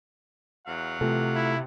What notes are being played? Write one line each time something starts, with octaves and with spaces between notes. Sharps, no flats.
E2 F#3 F5 F#5
C3 E3 A3 F4 A4
E4